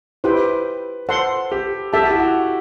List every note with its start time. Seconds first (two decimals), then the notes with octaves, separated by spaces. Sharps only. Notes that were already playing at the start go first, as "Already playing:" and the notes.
0.24 E4 G4 B4 C5 G5
1.09 A4 C5 F#5 C6
1.52 G4
1.93 G4 A4 E5 A5
2.02 F#4
2.11 E4
2.20 F#4